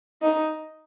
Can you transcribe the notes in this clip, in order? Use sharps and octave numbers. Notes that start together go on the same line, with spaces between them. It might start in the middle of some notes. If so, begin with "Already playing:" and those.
D#4